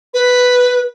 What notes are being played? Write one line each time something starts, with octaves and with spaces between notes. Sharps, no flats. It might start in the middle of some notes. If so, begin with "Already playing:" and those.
B4